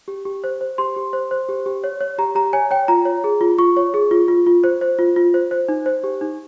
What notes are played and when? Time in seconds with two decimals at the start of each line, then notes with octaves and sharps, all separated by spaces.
0.08 G4
0.25 G4
0.44 C5
0.61 C5
0.78 G4 C6
0.96 G4
1.13 C5
1.31 C5
1.49 G4
1.66 G4
1.84 C#5
2.01 C#5
2.19 G4 A#5
2.35 G4 A#5
2.53 C#5 G#5
2.71 C#5 G5
2.88 F4 A#5
3.05 C#5
3.24 G#4
3.41 F4
3.58 F4 C#6
3.77 C#5
3.94 G#4
4.11 F4
4.28 F4
4.46 F4
4.64 C5
4.81 C5
4.99 F4
5.16 F4
5.34 C5
5.51 C5
5.69 D#4
5.86 C5
6.04 G4
6.21 D#4